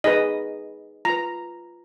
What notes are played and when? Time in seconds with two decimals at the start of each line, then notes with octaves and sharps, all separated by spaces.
0.04 D#4 G#4 B4 D#5
1.05 F4 B4 A#5